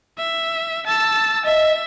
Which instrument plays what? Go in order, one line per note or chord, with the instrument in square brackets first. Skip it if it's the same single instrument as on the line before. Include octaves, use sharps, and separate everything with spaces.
[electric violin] E5
A5 E6
[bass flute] D#5 [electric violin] E5